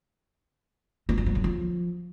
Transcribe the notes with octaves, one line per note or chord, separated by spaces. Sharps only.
A3
G3
F#3
D3
F3